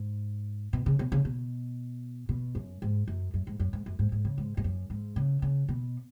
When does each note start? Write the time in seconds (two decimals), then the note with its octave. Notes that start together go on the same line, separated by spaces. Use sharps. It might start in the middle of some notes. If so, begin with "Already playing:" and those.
Already playing: G#2
0.73 B2
0.86 C#3
0.99 B2
1.12 C#3
1.25 B2
2.29 B2
2.55 F#2
2.82 G#2
3.08 F#2
3.34 F#2
3.47 G#2
3.60 F#2
3.73 G#2
3.86 F#2
3.99 G#2
4.12 G#2
4.25 C#3
4.38 G#2
4.57 G#2
4.64 F#2
4.90 G#2
5.16 C#3
5.42 C#3
5.68 B2